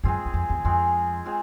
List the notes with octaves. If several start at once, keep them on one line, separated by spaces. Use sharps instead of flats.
F#2 G#3 C4 F4 G#4
E2
F2
E2
F2 G#3 C4 F4 G#4
G#3 C4 F4 G#4